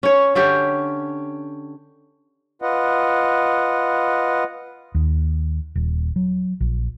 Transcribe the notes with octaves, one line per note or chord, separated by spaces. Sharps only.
C#4 C#5
D3 C#4 G4
F4 B4 D#5 F#5
D#2
D#1
F#3
A#1